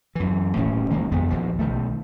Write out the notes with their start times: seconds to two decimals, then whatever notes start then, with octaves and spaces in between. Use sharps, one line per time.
0.15 F#2 E3
0.56 D#1 A2 C#4
0.90 C2 D#3 G#3 A#3
1.11 F#1 F2 B3
1.30 A#1 D#2 F3
1.59 B1 D#3 A3